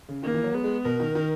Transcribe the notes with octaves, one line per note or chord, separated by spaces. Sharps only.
C#3
D#3 A#3
E3
F#3
G#3 B3
G#3
B2 A#4
D#3
D#3